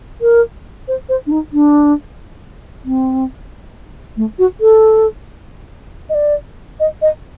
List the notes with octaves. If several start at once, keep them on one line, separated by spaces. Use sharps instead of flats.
A#4
C5
C5
D4
D#4
D4
C4
A3
F#4
A4
D#5
D5
D#5
D#5